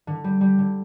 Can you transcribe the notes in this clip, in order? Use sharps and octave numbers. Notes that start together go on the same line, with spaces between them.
D3
G3
G3
D3